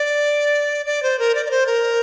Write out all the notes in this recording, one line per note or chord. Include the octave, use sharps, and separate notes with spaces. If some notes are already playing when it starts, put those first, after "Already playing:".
Already playing: D5
D5
C5
A#4
D5
D5
C5
A#4